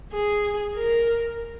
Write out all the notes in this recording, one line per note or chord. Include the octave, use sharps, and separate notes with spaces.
G#4
A#4